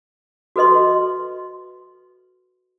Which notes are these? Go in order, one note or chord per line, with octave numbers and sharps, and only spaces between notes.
F#4 A4 B4 D#5 C6